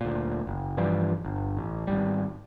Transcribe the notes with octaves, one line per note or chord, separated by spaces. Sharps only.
D2 A#2
F#1
G2 E3 F3 G3
G1
A1
G#1 D#2 G3